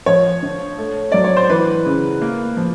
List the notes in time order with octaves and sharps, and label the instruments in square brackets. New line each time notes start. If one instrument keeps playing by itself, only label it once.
[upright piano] F3 C#5
D3
A3
F#3 D5
C#5
C5
E3 B4
C#3
A#3
F3